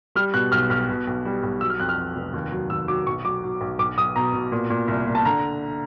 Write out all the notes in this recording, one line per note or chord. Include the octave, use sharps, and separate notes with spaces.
G3 F6
B2 F#6
B1 F6
B1 F6
B2
B1
G3
B1
F#3 E6
F6
F2 F#6
F6
F2
F1
D#2
F#3
D#2 E6
F#3 D6
B1 C#6
F#3 D6
F#3
B1
B1 D6
B1 D#6
B2 A#5
B2
A#2
A#2
C2
A#2
A5
D3 A#5